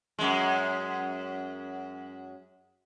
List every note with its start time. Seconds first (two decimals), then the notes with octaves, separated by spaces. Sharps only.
0.19 F#2 G#3